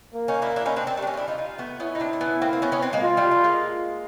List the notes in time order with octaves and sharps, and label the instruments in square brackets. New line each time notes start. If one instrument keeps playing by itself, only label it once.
[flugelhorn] A#3
[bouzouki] C#4 D#4
D4 E4
D4 E4
C#4 D#4
C4 D4
C4 D4
G3 A3
D4
C#4 D#4
F4
D4 E4
D#4 F4
D#4 F4
A3 B3
[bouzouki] B3 C#4 [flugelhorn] E4
[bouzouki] D#4
C4 D4
D4
B3 C#4
A#3 C4
C4
B3 C#4
B3 C#4
C4 D4
G#3 A#3
[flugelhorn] F4
[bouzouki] G3 A3
G3 A3
G#3 A#3